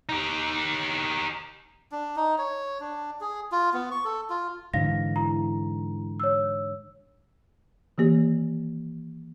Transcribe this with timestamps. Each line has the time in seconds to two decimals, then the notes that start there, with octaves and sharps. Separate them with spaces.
0.09 D#4 G4
1.92 D4
2.16 D#4
2.38 C#5
2.80 D4
3.21 G#4
3.52 F4
3.73 B3
3.91 C#6
4.04 A4
4.30 F4
4.74 G#2 D3 E3 F5 A#6
5.16 E4 A#5
6.20 C#5 E6
7.98 D#3 E3 A#3 G4